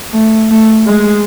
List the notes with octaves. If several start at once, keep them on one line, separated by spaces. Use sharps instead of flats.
A3
A3
G#3